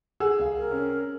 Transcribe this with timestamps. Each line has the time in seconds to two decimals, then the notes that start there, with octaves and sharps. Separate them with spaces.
0.20 G#4 F#5 G#5 E6
0.39 C2 F5
0.57 A#4
0.70 C4 C#4